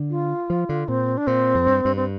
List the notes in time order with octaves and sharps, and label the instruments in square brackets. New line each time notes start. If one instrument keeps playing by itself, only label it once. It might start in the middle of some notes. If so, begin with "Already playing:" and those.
Already playing: [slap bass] D3
[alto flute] F4
[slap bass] F3
D3
[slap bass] A#2 [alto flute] C4
[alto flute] D4
[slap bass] A#2 [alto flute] C4
[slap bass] F2
G2
G2
[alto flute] C4